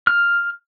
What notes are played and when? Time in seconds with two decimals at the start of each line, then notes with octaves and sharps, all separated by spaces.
0.07 F6